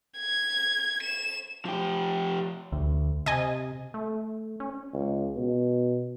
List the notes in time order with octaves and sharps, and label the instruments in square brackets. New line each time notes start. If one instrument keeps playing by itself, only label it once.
[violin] G#6
E7
[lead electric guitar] F3 G4
[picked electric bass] D2
[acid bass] C3 [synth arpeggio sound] D#5 G#5
[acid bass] A3
C#4
[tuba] C#2
B2